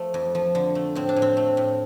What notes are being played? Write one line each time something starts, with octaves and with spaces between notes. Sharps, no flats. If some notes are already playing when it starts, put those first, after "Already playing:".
Already playing: F3 A3
F2
F3
D3
A3
A2 C4
D4
A2
C4
A3
A2